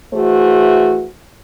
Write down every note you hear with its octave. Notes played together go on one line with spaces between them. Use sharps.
E3 A3 F#4 G#4 C5